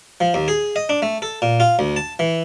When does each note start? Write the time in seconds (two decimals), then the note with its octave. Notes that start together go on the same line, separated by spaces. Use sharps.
0.21 F3
0.34 D#2
0.48 G#4
0.76 D#5
0.89 D4
1.02 A3
1.22 A4
1.42 A#2
1.60 F4
1.79 D2
1.96 A5
2.19 E3